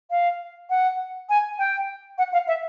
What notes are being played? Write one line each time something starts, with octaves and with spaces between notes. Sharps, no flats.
F5
F#5
G#5
G5
F#5
F5
E5